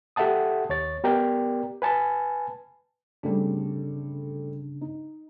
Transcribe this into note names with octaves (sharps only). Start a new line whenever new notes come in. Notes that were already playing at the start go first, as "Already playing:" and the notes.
G4 A4 E5 F#5 A5 D#6
D#2 C#5 A6
B3 G4 A#4 D5 G5
B4 G#5 A5 B5
G2 C#3 G3 A3 C4 D4
D#4